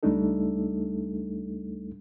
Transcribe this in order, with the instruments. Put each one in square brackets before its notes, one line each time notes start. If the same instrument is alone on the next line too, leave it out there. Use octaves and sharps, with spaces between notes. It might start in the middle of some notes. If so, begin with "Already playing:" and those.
[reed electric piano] C#2 G3 A3 D4 D#4 A4